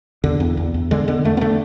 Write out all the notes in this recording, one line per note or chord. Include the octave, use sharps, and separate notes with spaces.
E2 D3
E2
E2
E2
D3 G#3
D3 B3
E2 A3
B3
D3 A3